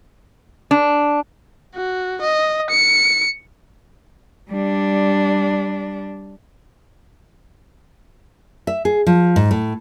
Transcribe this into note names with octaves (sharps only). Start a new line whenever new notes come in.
D4
F#4
D#5
C#7
G3 D4
E5
G#4
F3
G#2
A2